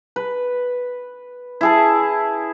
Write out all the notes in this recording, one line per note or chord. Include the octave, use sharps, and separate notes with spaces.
B4
E4 G#4 A5